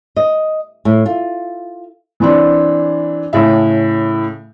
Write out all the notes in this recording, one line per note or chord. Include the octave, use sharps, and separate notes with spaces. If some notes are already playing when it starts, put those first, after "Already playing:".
D#5
A2
F4
E3 C4 D4
A2 C#3 E5